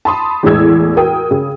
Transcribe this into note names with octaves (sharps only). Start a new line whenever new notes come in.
A5 B5 C6 D#6
E2 A2 E3 G#3 E6 G#6
F#4 A#4 G5 D#6
C#3